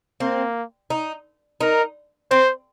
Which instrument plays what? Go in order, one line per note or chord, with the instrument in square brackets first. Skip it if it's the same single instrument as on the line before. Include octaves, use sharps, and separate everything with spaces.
[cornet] A#3 [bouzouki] C4
[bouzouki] D#4
[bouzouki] D#4 [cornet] A#4
[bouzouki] C4 [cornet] C5